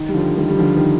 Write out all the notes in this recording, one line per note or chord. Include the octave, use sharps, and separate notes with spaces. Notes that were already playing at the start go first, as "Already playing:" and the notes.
Already playing: D#3
G3
D3 F3
D#3 G3
G3
D3 F3
D#3